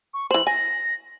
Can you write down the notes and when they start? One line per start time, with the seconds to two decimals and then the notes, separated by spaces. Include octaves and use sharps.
0.14 C#6
0.31 E3 C5 F#7
0.47 G#5 A#6